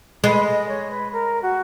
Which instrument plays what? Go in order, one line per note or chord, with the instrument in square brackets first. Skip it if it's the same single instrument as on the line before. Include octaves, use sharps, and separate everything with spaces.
[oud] G#3 [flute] B4
[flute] D#5
C#5
B4
A#4
F#4